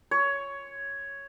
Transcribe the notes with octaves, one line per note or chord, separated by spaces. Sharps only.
C#5